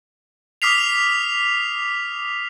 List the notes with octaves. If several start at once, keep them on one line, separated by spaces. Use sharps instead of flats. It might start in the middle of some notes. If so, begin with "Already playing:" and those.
D6 D#6 F6 B6 C7 F7